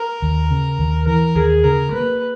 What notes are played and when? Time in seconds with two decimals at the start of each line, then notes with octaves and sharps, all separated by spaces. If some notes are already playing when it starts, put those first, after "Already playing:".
Already playing: A#4
0.22 D#2
0.51 C#3
0.79 D#2
1.07 E3 A#4
1.35 D#2 G#4
1.64 C#3 A#4
1.92 A#3 B4